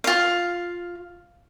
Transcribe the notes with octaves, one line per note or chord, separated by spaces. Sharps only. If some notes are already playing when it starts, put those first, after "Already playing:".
F4 F5